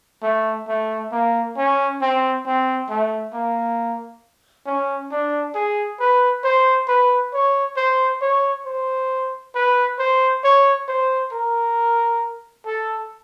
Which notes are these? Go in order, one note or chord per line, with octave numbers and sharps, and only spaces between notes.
A3
A3
A#3
C#4
C4
C4
A3
A#3
C#4
D4
G#4
B4
C5
B4
C#5
C5
C#5
C5
B4
C5
C#5
C5
A#4
A4